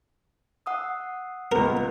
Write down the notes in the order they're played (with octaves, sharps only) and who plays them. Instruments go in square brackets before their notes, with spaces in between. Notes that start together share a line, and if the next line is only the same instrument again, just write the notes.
[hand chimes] F#5 D#6 E6
[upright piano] C#2 A#3 B3 [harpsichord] A#4